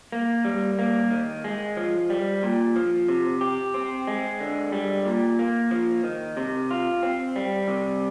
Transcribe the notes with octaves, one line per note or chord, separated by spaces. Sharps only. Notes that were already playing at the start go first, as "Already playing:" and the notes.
A#3
G3
A#3
D#3
G#3
F3
G3
A#2
F3
C3
G4
C4
G#3
D3
G3
A#2
A#3
F3
D#3
C3
F4
C4
G3
C3